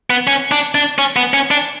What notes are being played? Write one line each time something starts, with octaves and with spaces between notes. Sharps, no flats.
B3
C#4
D4
D4
C#4
B3
C#4
D4